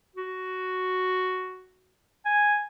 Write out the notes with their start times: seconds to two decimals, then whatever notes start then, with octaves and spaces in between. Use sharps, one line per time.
0.16 F#4
2.26 G#5